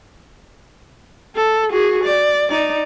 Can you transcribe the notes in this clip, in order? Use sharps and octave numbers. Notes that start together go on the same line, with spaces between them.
A4
F#4 G#4
D5
D#4 D5